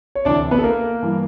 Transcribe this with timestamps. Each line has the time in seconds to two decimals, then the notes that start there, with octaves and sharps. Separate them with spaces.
0.15 C#5
0.25 D2 C3 E3 D4 D5
0.51 B3 B4
0.59 A4
0.64 A#3 A#4
1.02 G2 E3